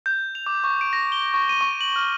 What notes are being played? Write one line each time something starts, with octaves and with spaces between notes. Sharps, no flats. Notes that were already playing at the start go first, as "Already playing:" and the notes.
G6
F7
D6
C#6
D7
A#6
G7
C#6
D#7
C#6
F#7
F6